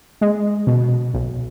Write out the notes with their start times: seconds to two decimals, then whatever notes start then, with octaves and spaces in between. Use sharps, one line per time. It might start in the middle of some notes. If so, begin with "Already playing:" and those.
0.21 G#3
0.67 B2
1.14 B1